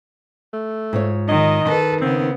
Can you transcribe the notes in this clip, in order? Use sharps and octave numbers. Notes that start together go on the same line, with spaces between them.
A3
G#2 F4 C#5
D#3 D#5
D#3 A4 B4
C#3 B3 C4